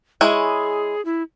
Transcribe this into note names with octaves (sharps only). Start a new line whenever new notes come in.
G#3 E4 G#4 C#5
E4